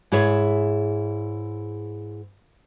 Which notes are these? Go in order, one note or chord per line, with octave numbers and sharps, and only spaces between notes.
G#2 E4 G#4 C#5 E5